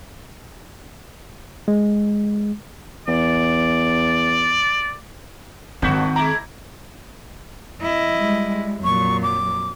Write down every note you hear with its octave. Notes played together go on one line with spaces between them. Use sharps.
G#3
E2 D5
G#1 G2 D#3 C4 F#4 G6 B6
G#3 E4 A#5 D6
F2 E4 D#5
G3 G#3
F2 A#2 F#3 C#6
D6